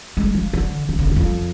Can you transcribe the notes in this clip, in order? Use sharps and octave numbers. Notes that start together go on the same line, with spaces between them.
G#3
F3
D3
E3
D3
E2
F2